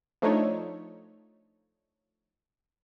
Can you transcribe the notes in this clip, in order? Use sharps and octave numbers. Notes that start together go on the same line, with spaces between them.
F3 A3 D4 D#4 C#5